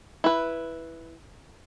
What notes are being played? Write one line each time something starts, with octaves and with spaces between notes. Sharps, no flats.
E4 B4